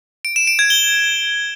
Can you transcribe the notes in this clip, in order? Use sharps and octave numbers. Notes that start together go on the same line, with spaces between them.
D7
E7
D7
G#6
G7